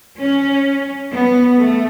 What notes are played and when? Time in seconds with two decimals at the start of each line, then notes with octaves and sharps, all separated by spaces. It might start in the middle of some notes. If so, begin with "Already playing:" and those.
0.19 C#4
1.12 B3
1.58 A3